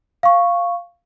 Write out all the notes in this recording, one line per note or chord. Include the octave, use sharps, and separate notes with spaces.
F5 C#6